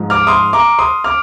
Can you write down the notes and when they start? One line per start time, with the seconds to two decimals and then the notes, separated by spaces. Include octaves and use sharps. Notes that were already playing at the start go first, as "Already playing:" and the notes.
Already playing: G#2 F3
0.10 D6 F6
0.27 C6 D#6
0.53 A#5 D6
0.79 C6 D#6
1.04 D6 F6